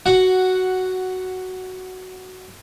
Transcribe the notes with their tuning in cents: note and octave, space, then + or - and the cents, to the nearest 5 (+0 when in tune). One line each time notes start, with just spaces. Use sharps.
F#4 +5 F#5 +0